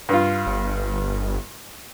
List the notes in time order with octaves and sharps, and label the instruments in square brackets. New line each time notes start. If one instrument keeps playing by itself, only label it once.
[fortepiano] G2 F4
[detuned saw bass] G1